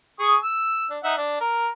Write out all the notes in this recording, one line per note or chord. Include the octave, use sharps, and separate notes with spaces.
G#4 C#6 D#6
E6
D4
D#4 E5 F#5
D4
A#4